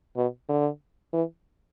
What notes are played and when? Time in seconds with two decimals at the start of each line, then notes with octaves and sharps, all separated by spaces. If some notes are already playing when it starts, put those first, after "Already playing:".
0.17 B2
0.49 D3
1.13 E3